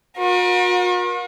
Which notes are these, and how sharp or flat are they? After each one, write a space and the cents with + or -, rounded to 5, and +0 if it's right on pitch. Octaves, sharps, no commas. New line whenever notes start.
F#4 -45 A#4 +35